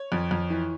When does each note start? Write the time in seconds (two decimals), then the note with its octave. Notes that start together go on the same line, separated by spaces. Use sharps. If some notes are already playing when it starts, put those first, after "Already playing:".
Already playing: C#5
0.12 F2
0.31 F2
0.50 E3